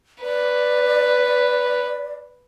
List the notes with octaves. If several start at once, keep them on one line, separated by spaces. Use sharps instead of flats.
B4 D5